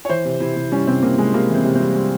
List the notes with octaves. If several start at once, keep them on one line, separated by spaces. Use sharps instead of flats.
C#5
E3 C5
C3
C3 E4
C3
G3 C#4
C3 C4
C3 A#3
C3 G#3
C3 A#3
E3 C4
C3
C4
G3
G3